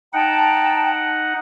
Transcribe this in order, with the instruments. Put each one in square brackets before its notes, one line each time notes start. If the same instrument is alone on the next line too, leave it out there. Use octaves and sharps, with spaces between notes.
[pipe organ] D#4 F#5 [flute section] G5 A5 A#5